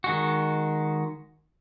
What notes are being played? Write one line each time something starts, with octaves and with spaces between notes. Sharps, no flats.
D#3 G#3 F#4